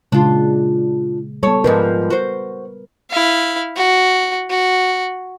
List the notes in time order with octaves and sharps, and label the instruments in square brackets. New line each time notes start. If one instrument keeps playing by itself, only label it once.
[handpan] A#2 C#3 G#3 [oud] D4 F4
[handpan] G3 B3 [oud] A4 C#5
[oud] G#2 F3 G3 [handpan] A#4 B4
[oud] F#4 C5
[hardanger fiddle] E4 F5
F#4
F#4